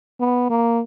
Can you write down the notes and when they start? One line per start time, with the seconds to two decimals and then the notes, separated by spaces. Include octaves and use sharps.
0.20 B3
0.50 A#3